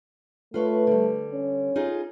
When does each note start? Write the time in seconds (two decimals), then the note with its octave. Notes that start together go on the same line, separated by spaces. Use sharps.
0.54 A3 F4 B4 C#5
0.87 D3 G3
1.33 C#4
1.76 D#4 F4 G#4